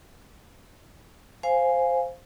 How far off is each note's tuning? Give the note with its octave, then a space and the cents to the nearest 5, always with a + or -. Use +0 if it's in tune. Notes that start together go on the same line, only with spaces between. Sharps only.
C5 +0 F5 +0 G#5 +0